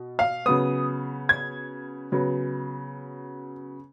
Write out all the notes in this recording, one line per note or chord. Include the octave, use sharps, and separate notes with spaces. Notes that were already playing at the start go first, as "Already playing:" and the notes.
Already playing: B2
F5
C#3 F#3 B3 D#6
G#6
C#3 F#3 B3